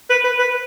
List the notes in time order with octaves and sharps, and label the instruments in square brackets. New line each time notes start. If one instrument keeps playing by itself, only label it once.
[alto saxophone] B4
B4
B4